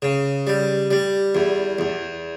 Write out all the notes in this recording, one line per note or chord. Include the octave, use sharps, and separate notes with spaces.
C#3
G3
G3
E2
E2